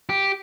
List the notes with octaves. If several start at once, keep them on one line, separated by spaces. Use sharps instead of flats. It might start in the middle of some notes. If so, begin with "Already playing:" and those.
G4